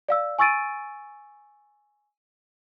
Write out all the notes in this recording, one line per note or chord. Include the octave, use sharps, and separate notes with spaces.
D5 F5 E6
G#5 C#6 E6 A6 D7 D#7